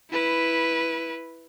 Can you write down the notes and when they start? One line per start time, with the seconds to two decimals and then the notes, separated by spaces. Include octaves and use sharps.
0.11 E4 B4